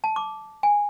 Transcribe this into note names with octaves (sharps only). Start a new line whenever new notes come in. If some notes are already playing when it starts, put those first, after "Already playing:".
A5
D6
G#5